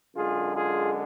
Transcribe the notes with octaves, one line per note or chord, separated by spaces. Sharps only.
F#2 D3 G#3 F4 G#4
F4 G#4